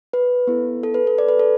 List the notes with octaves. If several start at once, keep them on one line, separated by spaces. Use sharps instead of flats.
B4
B3 E4 A4
A4
B4
A4
D5
B4
A4